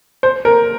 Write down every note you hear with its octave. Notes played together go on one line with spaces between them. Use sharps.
C5
A#4